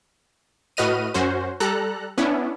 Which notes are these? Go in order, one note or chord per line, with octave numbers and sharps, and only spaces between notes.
A2 F#4 B4 D#5 F6 D#7
F#2 C#4 F#4 C5
G3 A4 A#5 F#6
B3 C#4 D4 E4